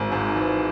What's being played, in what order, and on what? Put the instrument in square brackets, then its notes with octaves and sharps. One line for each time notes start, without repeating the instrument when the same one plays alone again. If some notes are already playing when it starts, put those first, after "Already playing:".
Already playing: [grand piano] G#1
G#2
E3